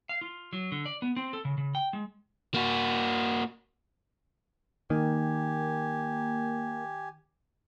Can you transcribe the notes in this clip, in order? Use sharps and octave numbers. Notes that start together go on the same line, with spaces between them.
F5
F4
F#3
D3
D5
B3
C4
A4
C#3
C#3
G5
G#3
A#3 F#4
D#3 A#3 G4 G#5